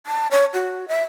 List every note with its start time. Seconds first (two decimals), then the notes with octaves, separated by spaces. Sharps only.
0.06 A5
0.31 C#5
0.54 F#4
0.88 E5